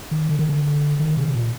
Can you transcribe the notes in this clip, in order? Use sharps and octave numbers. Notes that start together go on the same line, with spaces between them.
D#3
D3
D#3
D3
D#3
C3
C3
A#2